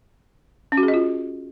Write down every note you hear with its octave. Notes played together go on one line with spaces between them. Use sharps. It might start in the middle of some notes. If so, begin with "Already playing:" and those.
C#4
F#4
G#4
D#5
F4